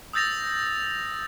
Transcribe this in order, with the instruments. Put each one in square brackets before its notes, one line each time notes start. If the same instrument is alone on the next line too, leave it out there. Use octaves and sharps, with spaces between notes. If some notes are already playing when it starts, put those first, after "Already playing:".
[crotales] D#6 E6 G6 A6 A#6 F7